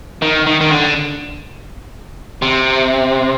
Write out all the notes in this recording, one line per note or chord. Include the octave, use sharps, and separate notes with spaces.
D#3
D#3
D#3
D3
C3